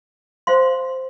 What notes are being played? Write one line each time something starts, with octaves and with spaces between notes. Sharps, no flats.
C5 F5 C6